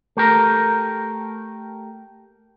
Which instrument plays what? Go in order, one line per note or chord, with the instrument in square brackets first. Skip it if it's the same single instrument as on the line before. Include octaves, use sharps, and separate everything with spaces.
[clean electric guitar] A3 G4 A#4